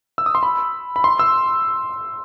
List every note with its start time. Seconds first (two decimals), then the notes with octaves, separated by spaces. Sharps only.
0.18 E6
0.26 D#6
0.35 C6
0.43 B5
0.96 B5
1.04 C6
1.19 E6